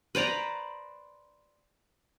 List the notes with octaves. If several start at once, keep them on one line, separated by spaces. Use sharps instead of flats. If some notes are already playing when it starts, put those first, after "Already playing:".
B4 C5 D5 A#5